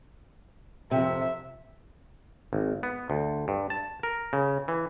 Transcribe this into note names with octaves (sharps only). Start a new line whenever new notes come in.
F2 C3 E5
G#1
B3
D2
G2
A5
A#4
C#3
E3